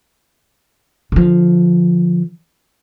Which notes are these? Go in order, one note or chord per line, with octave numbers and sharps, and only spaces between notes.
D3 F3